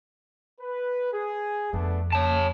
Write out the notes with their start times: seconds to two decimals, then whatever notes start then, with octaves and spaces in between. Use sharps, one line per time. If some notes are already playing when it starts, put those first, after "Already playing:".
0.61 B4
1.13 G#4
1.73 F2 A3 B3 D4
2.13 C#3 C#5 A5